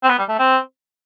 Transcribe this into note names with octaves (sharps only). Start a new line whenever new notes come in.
C4
B3
G3
A3
C4